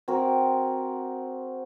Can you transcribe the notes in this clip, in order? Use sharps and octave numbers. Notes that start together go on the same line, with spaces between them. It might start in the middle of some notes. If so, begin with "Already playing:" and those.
C4 F#4 G#4 A#4